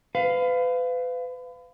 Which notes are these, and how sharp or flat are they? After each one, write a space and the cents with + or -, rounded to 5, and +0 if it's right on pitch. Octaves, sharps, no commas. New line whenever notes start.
B4 +35 F5 +0